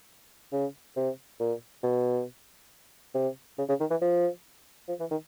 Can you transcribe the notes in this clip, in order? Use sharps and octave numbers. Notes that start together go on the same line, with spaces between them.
C#3
C3
A#2
B2
C3
C#3
C#3
D#3
E3
F3
F3
E3
D#3